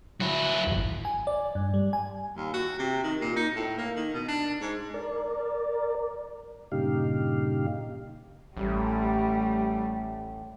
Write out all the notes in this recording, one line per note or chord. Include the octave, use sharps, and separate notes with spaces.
F#3 E4
G#1 E2
G#5
D5
G2
G3
G#5
D#2
F#4
C3
D#3
A#2
D#4
A2
A#3
D#3
B2
D4
G#2
A#4 D5
G2 A#2 C#3 D#4 G4 F5
A1 G3 A3